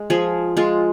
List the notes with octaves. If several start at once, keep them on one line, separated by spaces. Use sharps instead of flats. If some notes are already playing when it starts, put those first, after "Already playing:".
Already playing: G#3
F3 G#4
G#3 F4